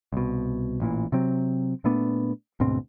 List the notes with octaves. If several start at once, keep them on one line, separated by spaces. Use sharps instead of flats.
C2 B2
A1 A#2 E3
C3 F#3 C4
A#2 A3 B3 D4
D2 G#2 B2 C4